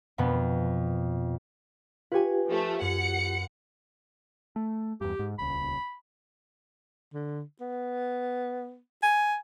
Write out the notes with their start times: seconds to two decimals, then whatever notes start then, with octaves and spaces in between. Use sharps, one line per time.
0.18 F2 B2 B3
2.12 F4 G4 B4 C#5 G#5
2.47 F3 A3
2.81 F#2 F#5 C#7
4.56 A3
5.01 E2 G2 G4
5.19 G#2
5.39 D#1 C#2 B5
7.14 D3
7.61 B3
9.03 G#5